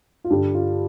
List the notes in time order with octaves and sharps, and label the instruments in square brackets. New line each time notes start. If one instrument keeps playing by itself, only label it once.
[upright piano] F4
G2 D3 G3 G4
F4